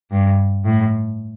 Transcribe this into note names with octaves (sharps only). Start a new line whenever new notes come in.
G2
A2